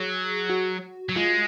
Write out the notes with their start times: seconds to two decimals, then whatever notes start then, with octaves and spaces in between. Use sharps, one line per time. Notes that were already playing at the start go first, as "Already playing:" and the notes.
Already playing: F#3 G#4
0.50 F#4
1.09 F#3
1.16 G#3 F4